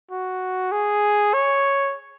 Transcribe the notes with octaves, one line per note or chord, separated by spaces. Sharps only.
F#4
G#4
C#5